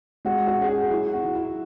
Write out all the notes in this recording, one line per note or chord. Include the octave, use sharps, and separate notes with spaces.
G#3 F#4
F#4
C#4 G#4
F#4
F#3 E4
F#4
F#3
E4